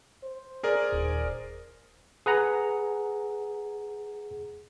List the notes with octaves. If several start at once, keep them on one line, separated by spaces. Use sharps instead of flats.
C5
G#4 A#4 D5
D#1
G#4 B4 F#5 A#5